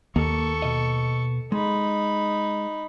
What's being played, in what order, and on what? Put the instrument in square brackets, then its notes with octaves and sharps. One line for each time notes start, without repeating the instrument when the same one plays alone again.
[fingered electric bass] D#2 [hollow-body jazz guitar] A#3 [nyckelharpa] A4 C#6
[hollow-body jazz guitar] B2 D#5
[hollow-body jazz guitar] G#3 [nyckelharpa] D#4 B5